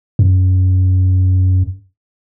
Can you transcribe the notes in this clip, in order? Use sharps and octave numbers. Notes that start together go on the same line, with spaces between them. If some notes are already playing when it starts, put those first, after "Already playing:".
F#2